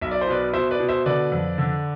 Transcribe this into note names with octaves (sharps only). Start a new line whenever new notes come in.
B1 E5
D5
C5
B2 B4 D5
B2 C5 E5
B4 D5
B2
C5 E5
D3 B4 D5
F2
D3